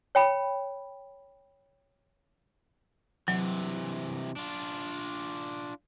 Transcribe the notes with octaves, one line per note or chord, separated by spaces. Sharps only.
C#5 G5 B5
C3 E3 F#3
D4 F4